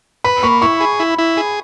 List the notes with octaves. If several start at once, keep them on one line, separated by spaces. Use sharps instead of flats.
B4 B5
A#3 C#6
E4 C#6
G#4
E4
E4
G#4